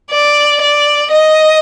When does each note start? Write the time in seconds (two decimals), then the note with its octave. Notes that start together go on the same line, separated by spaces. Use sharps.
0.11 D5
0.61 D5
1.11 D#5